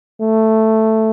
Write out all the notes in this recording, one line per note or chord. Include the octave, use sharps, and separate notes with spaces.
A3